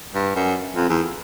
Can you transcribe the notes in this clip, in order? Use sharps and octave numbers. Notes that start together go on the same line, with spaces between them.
G2
F#2
F2
E2